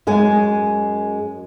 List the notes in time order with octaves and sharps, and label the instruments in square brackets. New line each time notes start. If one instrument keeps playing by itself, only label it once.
[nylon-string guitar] F#2 G#3 G#5